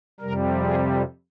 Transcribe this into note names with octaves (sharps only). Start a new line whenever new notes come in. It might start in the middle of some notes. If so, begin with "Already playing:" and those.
F2 C3 G3 A#4
G#4